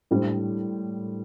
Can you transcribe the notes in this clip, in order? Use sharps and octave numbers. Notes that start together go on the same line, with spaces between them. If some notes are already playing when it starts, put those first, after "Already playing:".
A2 G3 D4 C5